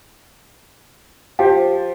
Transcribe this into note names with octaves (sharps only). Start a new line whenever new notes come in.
F3 G4